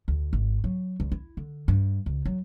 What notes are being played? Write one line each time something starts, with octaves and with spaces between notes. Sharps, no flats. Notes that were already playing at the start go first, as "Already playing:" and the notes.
D2
G#1
F#3
C#2
E4
D3
G2
C#2
F#3